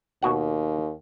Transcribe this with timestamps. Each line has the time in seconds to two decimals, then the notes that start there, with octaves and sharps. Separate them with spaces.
0.23 D#2 B2 F#4 F#5